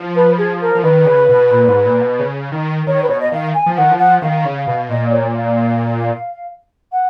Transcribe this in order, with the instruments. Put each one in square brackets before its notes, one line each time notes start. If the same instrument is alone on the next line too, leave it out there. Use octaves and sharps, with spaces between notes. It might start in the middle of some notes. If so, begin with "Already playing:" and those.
Already playing: [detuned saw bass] F3
[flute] B4
G#4
A#4
[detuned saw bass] F3
[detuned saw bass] D#3 [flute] B4
[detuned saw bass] C#3
B2
A#2
G#2
A#2
B2
C#3
D#3
[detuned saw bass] D#3 [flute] C#5
[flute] B4
[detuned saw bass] B2 [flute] C#5
[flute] D#5
[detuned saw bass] D#3 [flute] F5
[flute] G#5
[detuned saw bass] F3
[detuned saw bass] D#3 [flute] F#5
[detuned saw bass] F3
[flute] F#5
[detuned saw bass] D#3 [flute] F5
[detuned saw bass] C#3
[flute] F5
[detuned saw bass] B2
[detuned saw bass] A#2 [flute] D#5
[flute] C#5
F5
F#5